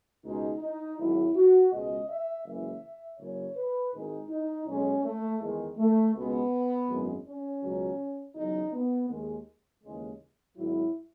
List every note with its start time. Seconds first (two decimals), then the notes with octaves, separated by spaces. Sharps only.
0.24 C#2 B2 G#3 D#4
0.61 D#4
0.98 G#1 G#2 F#3 E4
1.35 F#4
1.71 C#2 B2 G#3 D#5
2.09 E5
2.45 F#1 F#2 E3 G#3 E5
3.19 F#1 F#2 C#3 F#3 C#5
3.56 B4
3.92 G#1 G#2 D#3 G#3 D#4
4.29 D#4
4.66 B1 B2 G#3 C#4
5.04 A3
5.41 E2 D#3 G#3
5.77 A3
6.14 C#2 B2 G#3 B3
6.88 G#1 F#2 E3 G#3
7.25 C#4
7.62 C#2 B2 F#3
8.35 E2 C#3 F#3 D#4
8.73 B3
9.09 D#2 D#3 G#3
9.83 D#2 C#3 E3 G#3
10.57 G#1 G#2 F#3 E4